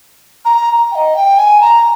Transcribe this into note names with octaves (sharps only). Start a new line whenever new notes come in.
A#5
G5
D#5
G5
G#5
A#5